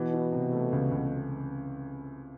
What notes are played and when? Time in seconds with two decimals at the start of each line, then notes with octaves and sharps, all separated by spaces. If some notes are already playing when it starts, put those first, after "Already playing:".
Already playing: B2 E3
0.14 E3
0.32 C3
0.53 A3
0.72 C#2
0.92 C#2